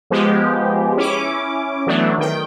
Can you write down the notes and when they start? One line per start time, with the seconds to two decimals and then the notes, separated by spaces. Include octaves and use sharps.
0.10 F3 G#3 B3 G4
0.97 C#4 E4 D6
1.87 E3 F#3 A3 B3 D4
2.18 D#3 G5